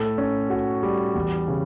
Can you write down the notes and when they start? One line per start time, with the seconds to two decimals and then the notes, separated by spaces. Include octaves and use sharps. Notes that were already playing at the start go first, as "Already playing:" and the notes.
Already playing: A2 A4
0.18 C#4
0.50 F#4
0.83 G3
1.15 E2
1.48 C#3